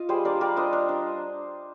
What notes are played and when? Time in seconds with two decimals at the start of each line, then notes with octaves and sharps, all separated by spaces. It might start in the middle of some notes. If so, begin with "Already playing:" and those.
Already playing: F4 D#5
0.09 G3 G#4 C5
0.25 D4 A#4 D5
0.41 G3 A#4 D5
0.57 D4 C5 D#5
0.73 D4
0.89 D4